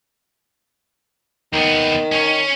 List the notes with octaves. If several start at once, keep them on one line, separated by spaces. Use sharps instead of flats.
D#2 D#3 B3
C#4 C#5